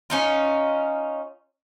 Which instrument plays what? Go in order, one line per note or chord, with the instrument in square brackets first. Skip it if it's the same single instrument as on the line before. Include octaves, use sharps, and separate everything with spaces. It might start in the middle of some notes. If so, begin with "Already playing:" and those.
[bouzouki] C#4 D#4 F4